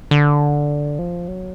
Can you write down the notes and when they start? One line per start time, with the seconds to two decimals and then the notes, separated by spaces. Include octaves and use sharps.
0.11 D3
0.99 F3
1.28 F#3